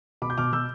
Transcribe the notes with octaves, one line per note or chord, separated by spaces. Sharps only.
B2 B5 D6
G6
B2 D6 F6
B2 E6 G6